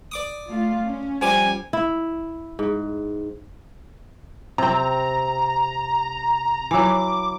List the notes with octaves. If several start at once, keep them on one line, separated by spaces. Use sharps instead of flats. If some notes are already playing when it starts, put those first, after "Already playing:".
D5 D6 D#6
A3 F4
C#4
F3 G3 G#5 D6
E4
G#2
C3 C4 A#5
E3 F#3 D6